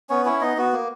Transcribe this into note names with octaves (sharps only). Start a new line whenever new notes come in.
B3 C#4 C#5
C#4 E4 C#5
B3 D#4 D#5
B3 F#4
A#3